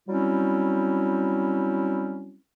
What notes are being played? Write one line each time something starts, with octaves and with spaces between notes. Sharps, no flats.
F#3 G3 C4 C#4 E4